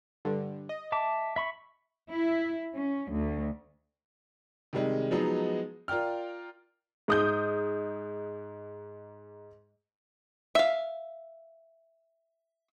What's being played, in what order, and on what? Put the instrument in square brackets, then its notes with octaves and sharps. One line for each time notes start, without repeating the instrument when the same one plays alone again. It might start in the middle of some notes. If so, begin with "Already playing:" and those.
[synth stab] G2 D3
D#5
[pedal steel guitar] E5 A5 D6
E5 B5 C#6
[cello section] E4
C#4
D2
[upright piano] C3 D#3 G3 G#3
F3 F#3 G#3 B3 D#4
F4 A#4 D5 G5 F6
[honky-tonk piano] G#2 D#6 G6
[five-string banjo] E5 F5